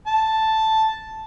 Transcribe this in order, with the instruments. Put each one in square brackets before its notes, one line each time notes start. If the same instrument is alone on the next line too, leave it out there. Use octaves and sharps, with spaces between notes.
[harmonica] A5